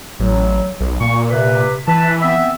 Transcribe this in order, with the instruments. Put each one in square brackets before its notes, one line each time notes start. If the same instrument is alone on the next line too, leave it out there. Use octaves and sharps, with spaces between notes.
[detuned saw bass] A1 [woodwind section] F#3
[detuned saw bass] B1
[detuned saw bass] A#2 [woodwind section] C#6
[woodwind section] C3 B4
[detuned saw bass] E3 [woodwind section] B4 A5
[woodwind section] B3 C4 E5